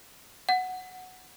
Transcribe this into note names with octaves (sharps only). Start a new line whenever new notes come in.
F#5